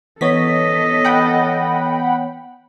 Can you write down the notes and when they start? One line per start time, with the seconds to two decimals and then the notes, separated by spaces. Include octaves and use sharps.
0.21 E3 B3 A4 C#5 D#5 B6
1.04 F#5 G5 B5